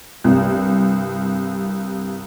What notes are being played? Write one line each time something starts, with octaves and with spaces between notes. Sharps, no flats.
C2 G2